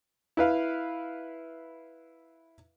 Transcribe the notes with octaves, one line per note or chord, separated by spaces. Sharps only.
E4 B4 F5